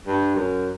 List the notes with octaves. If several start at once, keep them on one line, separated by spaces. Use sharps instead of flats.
G2
F#2